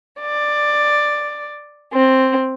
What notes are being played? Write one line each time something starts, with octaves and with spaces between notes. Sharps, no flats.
D5
C4